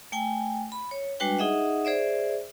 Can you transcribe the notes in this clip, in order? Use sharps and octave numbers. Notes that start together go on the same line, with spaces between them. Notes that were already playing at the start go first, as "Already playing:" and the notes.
A3 G5 G#5
B5
C#5
G3 G#3 D4 F#4 B4 G5
D#4 G#4 D#5 E5 F#5
G#4 C5 D5 E5